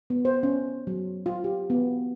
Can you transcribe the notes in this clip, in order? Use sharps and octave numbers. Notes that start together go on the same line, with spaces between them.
B3
C5
C#4
F#3
F4
G4
B3